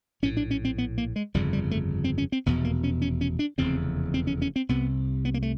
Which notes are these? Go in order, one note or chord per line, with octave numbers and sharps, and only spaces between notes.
A#1 A2 C#4
D4
C#4
C4
B3
A#3
G#3
G1 F2 C#3 G3
G3
A3
C4
C#4
C4
F1 E2 B2 B3
A#3
C#4
C#4
C#4
D4
F1 E2 C#3 C4
C4
C#4
C#4
C4
C2 C3 B3
B3
A#3
A3